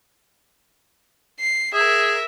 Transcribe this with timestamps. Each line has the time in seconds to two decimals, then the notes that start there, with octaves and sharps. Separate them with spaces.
1.39 C7
1.74 G#4 A#4 E5